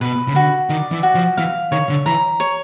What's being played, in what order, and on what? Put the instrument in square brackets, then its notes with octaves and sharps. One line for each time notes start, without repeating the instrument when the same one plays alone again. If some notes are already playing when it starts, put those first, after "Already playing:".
[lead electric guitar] B2 [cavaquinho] B4
[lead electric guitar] C#3
[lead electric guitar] D3 [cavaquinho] F#4
[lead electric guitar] D#3 [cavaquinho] D5
[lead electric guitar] E3
[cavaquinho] F#4
[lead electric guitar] F3
[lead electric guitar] E3 [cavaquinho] F5
[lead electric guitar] D#3 [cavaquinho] C#5
[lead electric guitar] D3
[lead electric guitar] E3 [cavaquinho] A#5
[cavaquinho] C#5